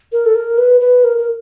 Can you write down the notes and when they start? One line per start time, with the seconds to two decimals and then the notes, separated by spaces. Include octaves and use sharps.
0.12 A#4
0.26 A4
0.35 A#4
0.58 B4
0.81 B4
1.04 A#4
1.18 A#4